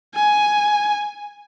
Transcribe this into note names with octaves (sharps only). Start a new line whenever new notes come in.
G#5